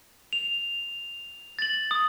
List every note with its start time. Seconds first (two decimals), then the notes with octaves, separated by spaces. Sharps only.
0.33 F7
1.59 A6 F#7
1.91 D#6